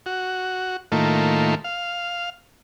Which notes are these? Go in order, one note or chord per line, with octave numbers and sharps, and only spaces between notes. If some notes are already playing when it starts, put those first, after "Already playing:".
F#4
A2 D#3 A3 A#3 F4
F5